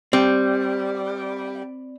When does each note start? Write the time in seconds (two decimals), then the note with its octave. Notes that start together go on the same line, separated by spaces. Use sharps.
0.13 G3 C4